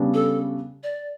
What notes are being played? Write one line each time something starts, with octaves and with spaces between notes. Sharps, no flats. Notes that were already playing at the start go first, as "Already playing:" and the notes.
Already playing: C#3 G3 B3 D4
A4
D5